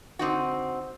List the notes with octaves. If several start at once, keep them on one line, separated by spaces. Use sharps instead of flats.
D3 C4 D#4 F#4